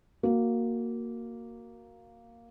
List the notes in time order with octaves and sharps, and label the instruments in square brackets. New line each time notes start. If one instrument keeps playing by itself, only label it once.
[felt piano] A#3 F#4